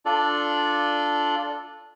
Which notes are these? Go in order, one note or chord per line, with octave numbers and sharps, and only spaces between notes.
D4 F4 A4 D5